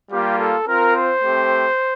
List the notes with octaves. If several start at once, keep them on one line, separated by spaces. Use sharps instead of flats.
G3 A#3 F4 G4
A4
C4 F4 A#4
C5
A3 C4 G4